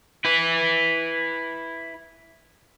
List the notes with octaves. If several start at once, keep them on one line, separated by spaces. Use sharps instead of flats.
E4 B4